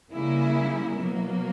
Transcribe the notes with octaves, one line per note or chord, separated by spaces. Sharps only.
C#3 G3 A#3 E4
B2 F#3 A#3